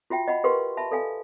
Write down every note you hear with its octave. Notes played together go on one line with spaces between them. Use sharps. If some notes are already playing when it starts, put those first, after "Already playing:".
F4 F#4 E5 G5
D#5 F#5 B5
G4 A#4 B4 F5 C6 C#6
E5 A5 B5
A4 D5 F5 G#5